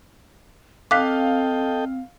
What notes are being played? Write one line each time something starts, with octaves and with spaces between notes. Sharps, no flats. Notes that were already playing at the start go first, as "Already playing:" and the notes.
C4 A4 D#5 F5 G5 D6 F#6 B6